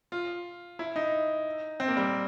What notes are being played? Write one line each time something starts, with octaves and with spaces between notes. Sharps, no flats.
F4
E4
D#4
C4
A#3
G3